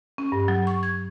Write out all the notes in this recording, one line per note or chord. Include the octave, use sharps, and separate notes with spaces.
C#4
G2
F#3
C#6
G#6